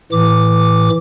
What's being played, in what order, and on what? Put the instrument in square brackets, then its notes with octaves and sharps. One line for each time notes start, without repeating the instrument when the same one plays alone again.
[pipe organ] A2 E3 D6